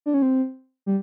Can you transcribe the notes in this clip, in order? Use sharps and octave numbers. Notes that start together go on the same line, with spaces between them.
D4
C#4
C4
G3